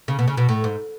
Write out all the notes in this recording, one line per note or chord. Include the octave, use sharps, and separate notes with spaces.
C#3
B2
C#3
B2
A2
G#2